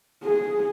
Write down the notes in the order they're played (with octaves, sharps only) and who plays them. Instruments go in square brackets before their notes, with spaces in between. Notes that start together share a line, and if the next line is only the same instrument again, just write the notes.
[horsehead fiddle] G#4